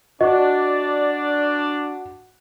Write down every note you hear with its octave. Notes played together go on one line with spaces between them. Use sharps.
D4 F#4 D5 D#5